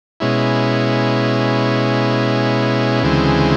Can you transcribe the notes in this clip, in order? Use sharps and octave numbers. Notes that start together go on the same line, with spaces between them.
B2 G#3 C#4 E4
D2 C#3 E3 G#3 C4